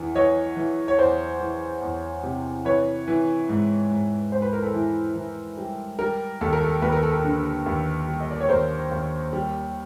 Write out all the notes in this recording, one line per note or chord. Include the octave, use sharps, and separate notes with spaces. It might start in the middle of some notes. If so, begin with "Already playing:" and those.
Already playing: E2 E3
E3 C#5 D#5
E3
C#5
E2 C5 D5
E3
E2
C3
E3 B4 C#5
E3
G#2
G#2
G#2 C5
B4
A#4
A4 B4
E3
E3
G3
G3 A#4
D#2 A4
A#4
A4
D#2 B4
A#4
A4
A#4
D3
D#2
G3
D#5
D5
C#5
D#2 A#4 C5
D#2
G3